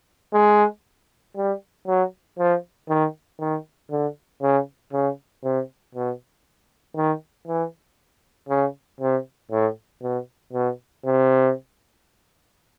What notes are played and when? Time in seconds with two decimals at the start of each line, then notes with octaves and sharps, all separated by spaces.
0.33 G#3
1.36 G3
1.87 F#3
2.38 F3
2.89 D#3
3.40 D#3
3.91 D3
4.42 C#3
4.93 C#3
5.44 C3
5.95 B2
6.96 D#3
7.48 E3
8.49 C#3
9.01 C3
9.51 A2
10.02 B2
10.53 B2
11.05 C3